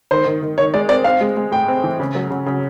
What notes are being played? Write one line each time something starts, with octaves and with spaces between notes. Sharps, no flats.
D#3 C5
D#3
D#3
D#3 C#5
G#3 D5
C4 D5
C4 F5
G#3
G#3
A2 G5
C4
E3
C#3
F#3
C#3
C#3